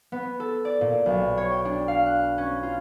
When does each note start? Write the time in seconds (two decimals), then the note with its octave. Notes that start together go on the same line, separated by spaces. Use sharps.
0.12 B3
0.40 A4
0.65 D5
0.81 A#2
1.06 B1
1.37 C#5
1.51 G5
1.65 D4
1.88 F5
2.06 F#6
2.38 C#4
2.63 F4